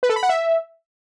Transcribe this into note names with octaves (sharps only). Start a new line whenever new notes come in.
B4
A4
B5
F#5
E5